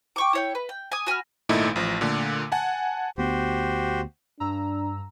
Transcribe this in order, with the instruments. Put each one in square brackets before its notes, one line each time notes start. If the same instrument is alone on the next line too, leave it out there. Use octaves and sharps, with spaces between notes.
[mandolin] G5 C#6 D6
E4 C#5 G5
B4
G5
G#5 D#6
F#4 G#5 B5 F6
[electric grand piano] G#1 A#2 A3 D#4 E4
A1 F3
A#2 D3 A3
F#5 G#5 A5
[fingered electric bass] D2 B3 [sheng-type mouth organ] F#4 G4 C5
[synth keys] G2 A#5 E6 [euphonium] D4